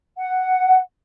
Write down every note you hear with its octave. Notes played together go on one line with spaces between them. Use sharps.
F#5